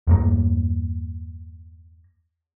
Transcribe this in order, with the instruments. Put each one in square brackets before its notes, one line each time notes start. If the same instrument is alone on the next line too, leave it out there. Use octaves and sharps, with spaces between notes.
[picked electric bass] E2 G2 A#3